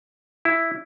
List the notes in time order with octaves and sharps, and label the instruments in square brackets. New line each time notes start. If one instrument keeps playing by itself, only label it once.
[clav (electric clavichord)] E4